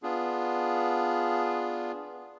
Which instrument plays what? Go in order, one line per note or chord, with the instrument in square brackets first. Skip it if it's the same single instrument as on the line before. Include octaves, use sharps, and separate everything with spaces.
[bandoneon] B3 D4 F4 G#4